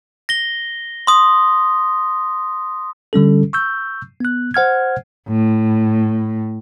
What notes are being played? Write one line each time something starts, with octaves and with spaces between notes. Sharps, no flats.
A#6 G7
C6 D#6
D3 G3 C#4 A4
C#6 E6 G6
B3 F#6
C5 F#5 F6 G#6
A2